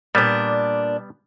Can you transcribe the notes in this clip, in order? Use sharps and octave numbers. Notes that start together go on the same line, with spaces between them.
A#2 G3 B3 D4